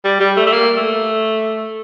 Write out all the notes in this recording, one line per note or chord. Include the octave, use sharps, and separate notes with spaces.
G3
G3
A3
A3
A#3
A3